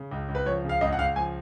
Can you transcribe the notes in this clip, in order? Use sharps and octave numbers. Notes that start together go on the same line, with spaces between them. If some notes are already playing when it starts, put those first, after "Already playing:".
Already playing: C#3
C#2
C#2
B4
F3 C#5
C#3
F5
C#2 D#5
F#5
C#2 F5
F3 G#5